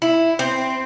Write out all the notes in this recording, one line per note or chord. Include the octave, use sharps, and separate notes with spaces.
E4
C4